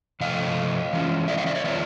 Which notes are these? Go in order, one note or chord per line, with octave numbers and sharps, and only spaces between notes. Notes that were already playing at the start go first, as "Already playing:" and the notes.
C3 F3 A3 D#5 F5
E3 G#3 C#4 F4
D5 E5
D#5 F5
D5 E5
C#5 D#5
D#3 G3 B3 D4 F4 D5 E5